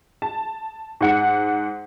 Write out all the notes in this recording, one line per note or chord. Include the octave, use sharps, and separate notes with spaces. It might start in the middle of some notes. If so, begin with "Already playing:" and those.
A5
G#2 F#5 C#7